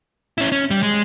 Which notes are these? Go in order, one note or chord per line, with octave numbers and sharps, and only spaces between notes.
C#4 E4
C#4
G3
G#3